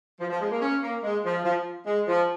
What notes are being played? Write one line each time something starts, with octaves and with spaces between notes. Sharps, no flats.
F3
F3
G#3
A#3
C#4
A#3
G#3
F3
F3
G#3
F3